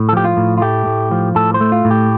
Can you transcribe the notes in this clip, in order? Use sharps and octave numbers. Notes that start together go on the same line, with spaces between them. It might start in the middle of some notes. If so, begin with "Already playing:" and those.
Already playing: A2
A4
F3 G4
F4
A2
F4
A3 G4
A2
F3
A2 A4
C5
A3
F4
A2
G4